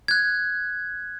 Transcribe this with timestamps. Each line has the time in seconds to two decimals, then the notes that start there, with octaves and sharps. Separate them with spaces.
0.08 F#6 G#6